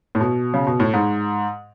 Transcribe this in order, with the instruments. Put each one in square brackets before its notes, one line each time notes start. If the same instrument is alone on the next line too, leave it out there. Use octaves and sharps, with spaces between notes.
[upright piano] A2
B2
C#3
B2
A2
G#2